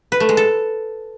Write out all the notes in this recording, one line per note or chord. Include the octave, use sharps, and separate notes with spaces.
B4
A3
G#3
A4